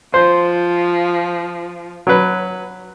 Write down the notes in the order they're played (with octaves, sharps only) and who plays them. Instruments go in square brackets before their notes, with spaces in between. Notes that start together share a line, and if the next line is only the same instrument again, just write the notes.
[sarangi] F3 [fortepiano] C5
[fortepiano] F#3 B4